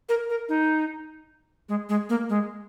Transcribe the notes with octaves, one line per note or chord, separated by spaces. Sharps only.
A#4
A#4
D#4
G#3
G#3
A#3
G#3